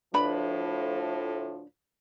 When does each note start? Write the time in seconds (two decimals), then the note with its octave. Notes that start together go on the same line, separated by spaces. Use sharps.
0.14 D2 A2 F3 D4 B4 B5